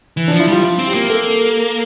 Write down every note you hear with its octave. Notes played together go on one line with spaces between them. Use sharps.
E3
F3 D4
E4
G3 F4
F4
C4
G4
A#3
A4